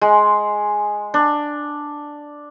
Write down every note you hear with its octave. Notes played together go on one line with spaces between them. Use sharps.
G#3
D4